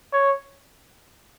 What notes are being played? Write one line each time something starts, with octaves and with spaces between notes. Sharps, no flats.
C#5